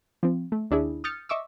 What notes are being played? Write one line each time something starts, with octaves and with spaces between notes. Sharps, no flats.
F3 C4
A3
D#2 D4 E4 G#4
D#6 F6 G6 A6 C#7
D#5 E5 C#6 D6 E6